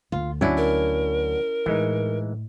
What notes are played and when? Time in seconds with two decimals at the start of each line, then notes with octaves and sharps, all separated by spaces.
0.12 D2 F4
0.41 F#3 C#4 D4 E4 D5
0.57 A#4
1.66 A2 E3 G#3 D#4